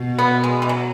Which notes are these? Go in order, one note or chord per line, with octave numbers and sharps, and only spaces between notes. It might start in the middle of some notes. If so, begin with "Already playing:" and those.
Already playing: B2
B3
G#3
E3
F#3